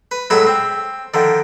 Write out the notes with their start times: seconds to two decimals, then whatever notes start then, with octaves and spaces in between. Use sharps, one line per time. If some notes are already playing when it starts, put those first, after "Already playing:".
0.11 B4
0.30 A2 F#3 G#3 E5 F#5 B5
0.47 C4
1.14 D3 D#3 F3